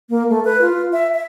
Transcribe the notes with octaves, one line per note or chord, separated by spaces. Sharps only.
A#3
A3
B4
F4
E5
E5